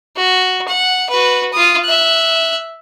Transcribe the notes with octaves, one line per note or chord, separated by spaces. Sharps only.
F#4
F#5
F#4 B4
F4 D#6
E5 F#6